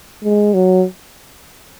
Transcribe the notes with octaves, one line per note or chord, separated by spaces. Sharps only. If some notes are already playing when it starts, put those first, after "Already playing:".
G#3
F#3